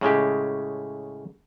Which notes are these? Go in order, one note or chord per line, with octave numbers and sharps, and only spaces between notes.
A2 C#3 G#3 G4